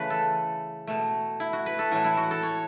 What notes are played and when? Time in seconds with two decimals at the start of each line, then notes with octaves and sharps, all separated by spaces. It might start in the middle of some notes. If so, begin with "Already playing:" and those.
Already playing: C#3 E3 A3 B4
0.10 A4
0.87 B2 A3
1.40 E4
1.53 F#4
1.66 B4
1.79 A4
1.91 A2 E3 A3 F#4
2.04 E4
2.17 F#4
2.31 A4
2.43 C#5